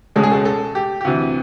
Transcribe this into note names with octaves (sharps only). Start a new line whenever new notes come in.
C#2 B2 G#3 C#4 A4
G#4
A4
A4
G4
G4
D2 C3 E3 F#4